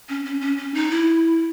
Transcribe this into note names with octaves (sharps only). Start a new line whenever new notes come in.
C#4
C#4
C#4
C#4
D#4
E4